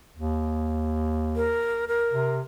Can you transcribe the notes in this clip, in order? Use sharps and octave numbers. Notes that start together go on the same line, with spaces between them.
D#2
A#4
A#4
C3